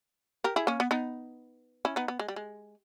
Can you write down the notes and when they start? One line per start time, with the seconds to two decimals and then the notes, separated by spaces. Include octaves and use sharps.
0.44 G4 A#4
0.56 E4 G#4
0.67 A#3 C#4
0.80 B3
0.91 B3 D#4
1.85 C#4 E4
1.96 B3 D#4
2.08 B3
2.19 G#3
2.28 G3
2.36 G#3